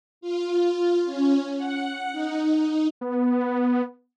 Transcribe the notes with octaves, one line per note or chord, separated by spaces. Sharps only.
F4
C#4
F#5
D#4
B3